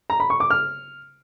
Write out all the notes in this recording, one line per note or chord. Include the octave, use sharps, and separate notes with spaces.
A#5
B5
C#6
D6
F6